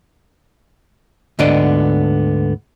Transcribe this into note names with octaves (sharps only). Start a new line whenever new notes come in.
D2 G#2 D3 B3 D5 D#5